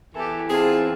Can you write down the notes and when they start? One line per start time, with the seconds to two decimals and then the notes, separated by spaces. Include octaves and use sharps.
0.14 E2 E3 G4 A4
0.49 C4 F4 G#4 A5